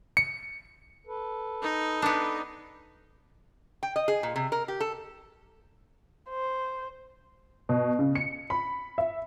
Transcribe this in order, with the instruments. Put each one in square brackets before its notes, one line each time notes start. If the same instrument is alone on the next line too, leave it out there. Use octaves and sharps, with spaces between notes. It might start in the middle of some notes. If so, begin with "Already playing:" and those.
[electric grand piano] C#7
[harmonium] A4 B4
[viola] D#4
[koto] B3 D4
[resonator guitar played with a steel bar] G5
D#5
G#4
A#2
C3
A#4
G4
A4
[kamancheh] C5
[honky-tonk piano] B2
C#3
C#7
B5
E5